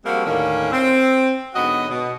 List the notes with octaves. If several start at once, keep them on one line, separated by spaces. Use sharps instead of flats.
F3 G3 G#3 A#3 C4 F#4
D#2 A2 D3 D#3 A#3 C#4
C4
G#2 D3 F#3 B3 F#4 D#5
B2